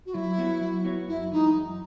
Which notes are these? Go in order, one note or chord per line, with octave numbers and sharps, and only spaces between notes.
F#4
F#3 E4
B3 F#4 C#5
F#3
B3 F#4 C#5
F#2 E4
E3 G#3 D#4
F#2